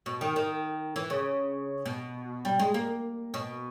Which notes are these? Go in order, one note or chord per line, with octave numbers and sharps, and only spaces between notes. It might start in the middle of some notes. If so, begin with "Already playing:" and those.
B2
D#3
D#3
E3
C#3
B2
G3
G#3
A#3
B2